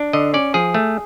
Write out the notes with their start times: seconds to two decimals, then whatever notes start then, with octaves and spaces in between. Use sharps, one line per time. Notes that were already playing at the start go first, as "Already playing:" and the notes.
Already playing: D4
0.13 D3 D#5
0.34 C#4 D5
0.54 F3 G#4
0.74 A3